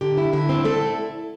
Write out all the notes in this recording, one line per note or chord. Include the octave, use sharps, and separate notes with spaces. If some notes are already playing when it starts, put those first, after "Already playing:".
D3 G4
E4
D3 E4
C4
D3 A3 A4
E4